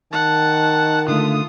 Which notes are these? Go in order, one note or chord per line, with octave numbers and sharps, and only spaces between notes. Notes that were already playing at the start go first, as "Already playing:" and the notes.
D#3 F#5 A5
D3 A3 F4 D#6